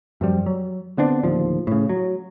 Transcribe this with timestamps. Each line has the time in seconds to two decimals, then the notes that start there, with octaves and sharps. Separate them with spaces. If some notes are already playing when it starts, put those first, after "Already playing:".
0.21 F#2 F3 G3
0.46 F#3
0.97 D3 B3 C4 D4
1.23 D1 D#2 F3
1.67 A2 C#3
1.89 F#3